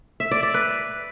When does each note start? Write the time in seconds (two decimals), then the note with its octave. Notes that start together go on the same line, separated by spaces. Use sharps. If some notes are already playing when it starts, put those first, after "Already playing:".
0.20 E5
0.31 D5
0.43 D5
0.54 B4